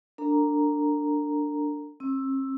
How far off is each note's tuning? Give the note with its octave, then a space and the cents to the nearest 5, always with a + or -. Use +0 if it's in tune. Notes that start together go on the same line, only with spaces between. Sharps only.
D4 +0 A#4 -45 A#5 +0
C4 +45 E6 +0